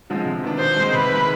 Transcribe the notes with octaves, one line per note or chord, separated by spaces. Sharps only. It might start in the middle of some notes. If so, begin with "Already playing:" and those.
D3 F3 G#3 C4
C3
D#3 B3 D4
B2 C5
G#3 C4 D#4
C3 B4
D#3 G#3